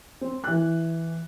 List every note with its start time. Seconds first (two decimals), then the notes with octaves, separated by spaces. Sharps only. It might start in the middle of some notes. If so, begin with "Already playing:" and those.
0.21 C4
0.44 E3 F#6